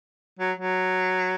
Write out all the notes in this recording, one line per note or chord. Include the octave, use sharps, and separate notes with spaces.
F#3
F#3